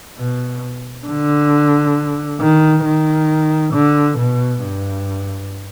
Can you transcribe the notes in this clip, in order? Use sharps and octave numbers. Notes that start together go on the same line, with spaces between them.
B2
D3
D#3
D#3
D3
B2
G2